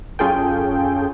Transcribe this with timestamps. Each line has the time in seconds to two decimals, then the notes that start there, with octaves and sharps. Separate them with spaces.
0.19 F#2 C#4 F4 G#4 A4 G5